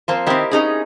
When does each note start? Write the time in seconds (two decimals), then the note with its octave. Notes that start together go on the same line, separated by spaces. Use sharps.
0.08 F3 A#3 C4
0.26 D#3 C4 E4 G4 A#4
0.51 C#4 D#4 G#4